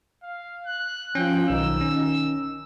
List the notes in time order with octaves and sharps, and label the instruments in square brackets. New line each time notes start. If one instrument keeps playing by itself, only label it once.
[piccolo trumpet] F5
F#6
[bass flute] F3 [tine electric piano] C#4 [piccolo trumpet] G5
[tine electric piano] B1 [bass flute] D#3 [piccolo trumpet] E6
[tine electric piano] C#4